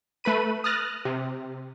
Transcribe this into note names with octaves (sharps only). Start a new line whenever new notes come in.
A3 B4 B5 D#7
D#6 F6 F#6 A6 A#6
C3